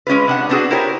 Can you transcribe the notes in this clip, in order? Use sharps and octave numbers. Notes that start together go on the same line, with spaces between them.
G#3 C#4 F4 B4
C3 D4 F#5
B3 C4 D4 F#4 G#4
E4 F4 G4 A#4 C5 C#5